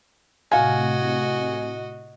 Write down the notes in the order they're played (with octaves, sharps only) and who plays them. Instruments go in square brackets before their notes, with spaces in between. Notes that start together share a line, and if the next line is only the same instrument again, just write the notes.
[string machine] A2 C3 [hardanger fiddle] F#4 D#5 [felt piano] F5 G#5